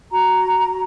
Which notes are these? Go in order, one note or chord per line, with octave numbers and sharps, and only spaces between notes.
F#4 A#5